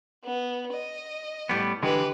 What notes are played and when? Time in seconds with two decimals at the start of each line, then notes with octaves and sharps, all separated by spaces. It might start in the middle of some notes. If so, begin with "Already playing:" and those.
0.25 B3
0.73 D#5
1.49 A2 G3 B3
1.83 D3 E3 G#3 G4 B4